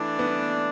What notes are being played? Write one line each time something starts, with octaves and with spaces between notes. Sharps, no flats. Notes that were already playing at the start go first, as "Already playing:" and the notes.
Already playing: E3 A3 D4
B3